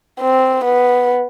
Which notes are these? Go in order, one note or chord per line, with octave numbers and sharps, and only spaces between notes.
C4
B3